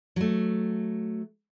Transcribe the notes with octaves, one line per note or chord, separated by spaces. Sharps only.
F#3 A3